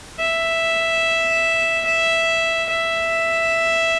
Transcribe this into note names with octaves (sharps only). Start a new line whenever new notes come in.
E5
E5
E5